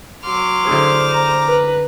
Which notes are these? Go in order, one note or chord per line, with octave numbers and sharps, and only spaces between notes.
F#3 C6 D6 F6
D3 E4 G#4 C5
A#5
B4